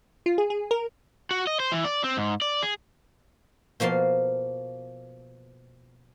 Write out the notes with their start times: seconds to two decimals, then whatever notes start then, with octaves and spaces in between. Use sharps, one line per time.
0.26 F4
0.38 G#4
0.50 G#4
0.71 A#4
1.31 F#4
1.47 D#5
1.60 C5
1.72 E3
1.85 D5
2.04 C4
2.17 G#2
2.42 D5
2.63 G#4
3.80 B2 F3 A#3 A5 C6